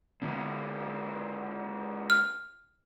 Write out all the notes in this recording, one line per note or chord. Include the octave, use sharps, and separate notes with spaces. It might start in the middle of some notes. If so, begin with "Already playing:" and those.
C#2 D3 F#3 B3 C4
F6